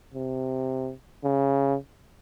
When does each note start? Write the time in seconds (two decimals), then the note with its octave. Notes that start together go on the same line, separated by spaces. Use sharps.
0.14 C3
1.24 C#3